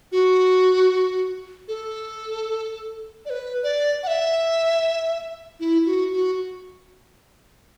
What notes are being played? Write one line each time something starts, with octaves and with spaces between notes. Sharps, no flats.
F#4
A4
D5
B4
D5
F#5
E5
E4
F#4
F#4